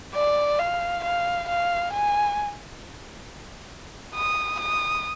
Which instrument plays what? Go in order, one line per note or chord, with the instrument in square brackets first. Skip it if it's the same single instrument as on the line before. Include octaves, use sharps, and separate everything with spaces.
[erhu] D5
F5
F5
F5
G#5
D#6
D#6